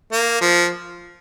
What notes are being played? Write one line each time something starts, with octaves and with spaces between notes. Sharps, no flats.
A#3
F3